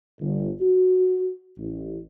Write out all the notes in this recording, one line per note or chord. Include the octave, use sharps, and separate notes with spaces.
G1
F#4
A1